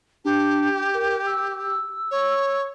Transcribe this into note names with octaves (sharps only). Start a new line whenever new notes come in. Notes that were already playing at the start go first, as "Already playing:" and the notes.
D4 G4
A#4
E6
C#5